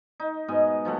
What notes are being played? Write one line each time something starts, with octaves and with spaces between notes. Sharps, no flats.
D#4
G#2 B2 D#5 G#5
F3 F#3 A3 F#5